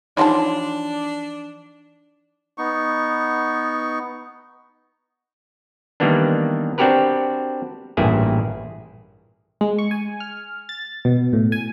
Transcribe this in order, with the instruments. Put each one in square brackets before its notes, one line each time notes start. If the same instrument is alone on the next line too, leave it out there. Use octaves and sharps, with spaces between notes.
[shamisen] E3 F3 A5 [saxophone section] D4 [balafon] D#4 C#5 C6
[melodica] B3 D#4 C#6
[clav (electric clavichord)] D#3 E3 G3 A#3 B3 D4
C4 D4 F#4 G4 A#4 B4
A1 G2 A#2 E4 G#4
[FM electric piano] G#3
C#6
G#5
F6
A6
B2
A2
G#5